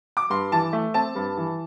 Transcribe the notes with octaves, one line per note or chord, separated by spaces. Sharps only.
D6
G2 C6
E3 A5
A3
C4 A5
G2
E3